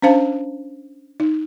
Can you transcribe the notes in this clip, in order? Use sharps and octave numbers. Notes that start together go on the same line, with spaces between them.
C#4 D4 C5 F5 A5
D#4